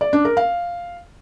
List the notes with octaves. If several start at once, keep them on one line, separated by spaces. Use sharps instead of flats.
D5
D4
A#4
F5